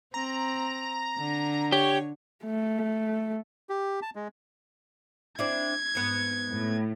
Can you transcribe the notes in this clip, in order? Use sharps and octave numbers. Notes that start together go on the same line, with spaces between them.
C4 A#5
D3
G4 C#5
A3
G4
A5
G#3
C4 D4 E4 G#6
G#2 B3
A2